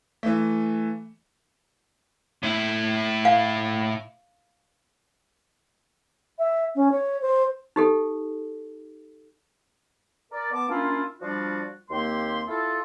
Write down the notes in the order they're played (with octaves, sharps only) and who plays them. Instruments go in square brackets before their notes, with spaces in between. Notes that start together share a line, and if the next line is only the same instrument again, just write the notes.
[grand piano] E3 A3
[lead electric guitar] A2 E4
[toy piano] F5
[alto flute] E5
C#4
C#5
C5
[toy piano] D#4 G4 A4
[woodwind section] A#4 D5
B3 A5 D6
A#3 C#4 D4 E4 F4
F3 G3 D4 F4 F#4 D5
D#2 A#3 C4 G4 C6
E4 F4 A4